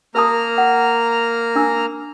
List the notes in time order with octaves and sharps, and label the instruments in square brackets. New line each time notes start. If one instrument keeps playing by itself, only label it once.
[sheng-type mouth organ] A#3 A#5 F6 [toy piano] A#4 A5 D#6
[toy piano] F#5
D4 E6